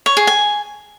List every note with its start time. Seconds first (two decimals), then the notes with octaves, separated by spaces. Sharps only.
0.06 C#5
0.17 G#4
0.27 G#5